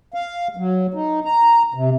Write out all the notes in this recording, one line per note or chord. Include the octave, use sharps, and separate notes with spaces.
F5
F#3
D#4
A#5
C3